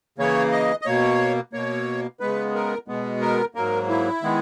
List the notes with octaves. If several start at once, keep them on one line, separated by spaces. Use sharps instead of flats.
C#3 E3 A#3 C#5
D#5
D#5
B2 A#3 C#5
B2 A#3 C#5
C#3 G#3 B3 B4
A#4
B2 G#3 B3
A#4
G#2 F#3 A#3 A#4
E4
D#3 G#3 B3